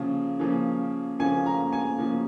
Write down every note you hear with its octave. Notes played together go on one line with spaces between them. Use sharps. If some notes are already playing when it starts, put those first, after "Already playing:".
Already playing: C#3 F3 A#3 C#4
C#3 F3 A#3 C#4
C#3 F3 A#3 C#4 G#5
A#5
G#5
C#3 F3 A#3 C#4